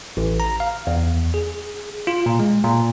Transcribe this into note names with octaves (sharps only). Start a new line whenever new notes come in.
A1
A#5
F5
E2
G#4
F4
A#2
G#3
A#2